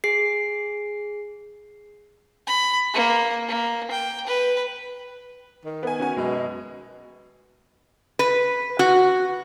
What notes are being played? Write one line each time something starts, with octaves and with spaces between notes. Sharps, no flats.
G#4 C7
B5
A#3
A#3
G5
B4
D#3
B3 G#5
C#4 F#4 G#5
F#2 B2 G#3
B4
F#4